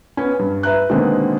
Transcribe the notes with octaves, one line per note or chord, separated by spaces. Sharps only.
B3 C#4
G2
B4 E5 A#5 F#6
B2 D3 D#3 G#3 A#3 C4